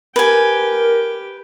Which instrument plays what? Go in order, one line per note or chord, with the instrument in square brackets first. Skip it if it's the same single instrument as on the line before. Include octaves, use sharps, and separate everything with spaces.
[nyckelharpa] G4 G5 [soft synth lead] A#4 [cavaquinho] B4 G#5